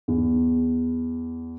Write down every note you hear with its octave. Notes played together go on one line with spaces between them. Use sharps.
E2